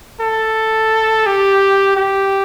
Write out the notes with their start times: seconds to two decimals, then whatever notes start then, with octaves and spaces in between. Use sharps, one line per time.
0.20 A4
1.26 G4
1.97 G4